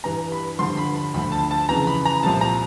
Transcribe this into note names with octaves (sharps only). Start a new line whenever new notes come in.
G2 E3 A#5
B5
G2 D3 F3 C6
B5
B5
D2 D3 F3 B5
A5
A5
F2 C#3 E3 A#5
B5
A#5
C2 A#2 F3 A5
A#5